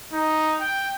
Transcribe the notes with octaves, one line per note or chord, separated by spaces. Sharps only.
D#4
G5